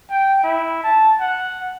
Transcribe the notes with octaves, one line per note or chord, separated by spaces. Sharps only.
G5
E4
A5
F#5